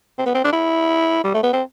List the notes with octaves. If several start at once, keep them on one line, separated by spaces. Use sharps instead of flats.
C4
B3
C4
D4
E4
G3
A3
B3
C4